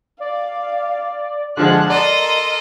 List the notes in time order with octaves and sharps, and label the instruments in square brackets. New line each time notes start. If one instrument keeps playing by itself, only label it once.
[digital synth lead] D5 [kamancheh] F5
[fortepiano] D3 F3 G#3 [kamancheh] F#5 F#6 [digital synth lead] A5
[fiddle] A4 D#5 [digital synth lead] A#4 [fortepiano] D5 [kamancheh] C6